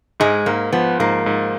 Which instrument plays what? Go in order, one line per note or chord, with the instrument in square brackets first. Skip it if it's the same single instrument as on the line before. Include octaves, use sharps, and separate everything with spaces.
[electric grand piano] G#2 [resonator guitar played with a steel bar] G#3
[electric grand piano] G#2 [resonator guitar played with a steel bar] A#3
[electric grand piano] F3 [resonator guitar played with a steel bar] B3
[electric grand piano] G#2 [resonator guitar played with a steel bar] A#3
[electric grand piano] G#2